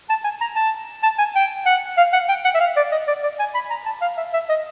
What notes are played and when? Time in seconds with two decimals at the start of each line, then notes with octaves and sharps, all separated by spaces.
0.10 A5
0.24 G#5
0.41 A#5
0.56 A5
1.03 A5
1.19 G#5
1.35 G5
1.66 F#5
1.98 F5
2.13 F#5
2.29 G5
2.45 F#5
2.55 E5
2.60 F5
2.77 D5
2.92 D#5
3.08 D5
3.24 D5
3.40 G#5
3.55 B5
3.70 A#5
3.86 A5
4.02 F5
4.17 E5
4.34 E5
4.49 D#5